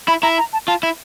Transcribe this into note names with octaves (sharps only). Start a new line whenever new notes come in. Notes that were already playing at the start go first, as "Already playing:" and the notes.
E4 B5
E4 A#5
A#5
A5
F4 A5
E4